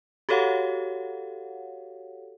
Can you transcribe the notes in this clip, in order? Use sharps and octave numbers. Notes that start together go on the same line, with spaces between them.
F#4 G4 A4 C#5 F5 F#5